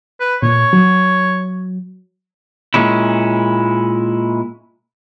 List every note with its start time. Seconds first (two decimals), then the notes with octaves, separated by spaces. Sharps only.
0.20 B4
0.42 A#2 C#5
0.73 F#3
2.74 A#2 G#3 C#4 E4